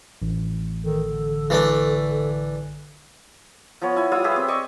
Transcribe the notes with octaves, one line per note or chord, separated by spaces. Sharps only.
A1
D#3 A4
D3
E3 A3 D4
F3 B3 C#5
E4 G#5
G3 F4 D#6 E6
G4 G#4 B4 E5
C4
D5 D#5 C#6 D#6